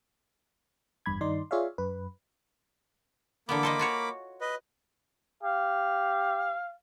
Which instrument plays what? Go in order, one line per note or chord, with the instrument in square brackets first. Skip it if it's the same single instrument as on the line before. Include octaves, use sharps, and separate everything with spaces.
[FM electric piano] G#1 E2 G2 B5 G#6
G2 D#3 D#4 D5 C6
F4 G#4 C#5 D5 E5 F5
F#2 B4
[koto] D3 E3 B3 [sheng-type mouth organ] A#3 B5 D6
[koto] A4 C5 D#5
F4 F#4 C#5
[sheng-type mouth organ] B4 D#5
[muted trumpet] G4 [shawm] F5